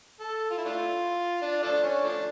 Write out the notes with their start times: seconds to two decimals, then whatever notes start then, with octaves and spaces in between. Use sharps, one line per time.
0.20 A4
0.50 F4
0.58 E4
0.65 A3 D4 F4
1.42 D4
1.62 F3 A3 D4
1.83 C#4
2.04 F3 A3 D4